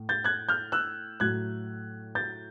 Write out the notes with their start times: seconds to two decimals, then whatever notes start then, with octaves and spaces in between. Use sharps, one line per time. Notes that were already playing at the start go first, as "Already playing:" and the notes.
Already playing: A2
0.09 G6 A6
0.24 F#6 G#6
0.49 F6 G6
0.72 E6 F#6
1.20 A2 F#3 F#6 G#6
2.15 G6 A6